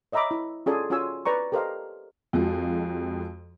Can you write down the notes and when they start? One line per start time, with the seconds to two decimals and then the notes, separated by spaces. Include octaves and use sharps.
0.12 C#5 D#5 E5 A#5 B5 D6
0.31 E4
0.66 C#4 F4 G#4 A4 D5 G#5
0.90 C#4 F4 F#4 C#5 G#5 E6
1.25 B4 D5 A#5 C#6
1.52 G4 A4 A#4 C5 D#5 F5
2.33 F2 F3 G#3 F#4